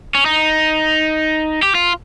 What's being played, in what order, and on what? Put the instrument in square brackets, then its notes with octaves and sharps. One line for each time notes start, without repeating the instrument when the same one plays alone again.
[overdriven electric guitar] C#4
D#4
G4
F4